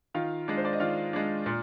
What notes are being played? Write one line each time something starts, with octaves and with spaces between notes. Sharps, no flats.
D#3 F4 F5
G#3 D4
C5
D5
D#5
D#3 F4 F5
G#3 D4
A#2